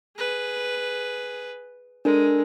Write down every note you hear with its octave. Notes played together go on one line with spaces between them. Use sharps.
G#4 B4
G#3 D4 A4 A#4